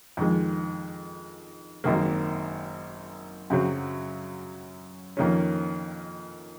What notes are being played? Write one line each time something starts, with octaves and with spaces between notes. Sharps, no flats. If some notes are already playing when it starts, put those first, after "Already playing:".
F2 D#3 G#3
G#1 F#2 D#3 A#3
F#2 C#3 F#3 C4
F2 D#3 A#3 C#4